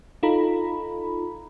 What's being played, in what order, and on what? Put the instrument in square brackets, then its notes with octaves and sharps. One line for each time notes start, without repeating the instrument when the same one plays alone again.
[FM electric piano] D#4 F4 A4 A#5 B5